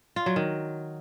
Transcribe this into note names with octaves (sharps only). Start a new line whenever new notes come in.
F4
F#3
D#3